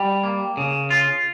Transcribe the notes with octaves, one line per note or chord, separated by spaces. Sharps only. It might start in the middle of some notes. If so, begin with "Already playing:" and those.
Already playing: G3
A#3
C#3
F4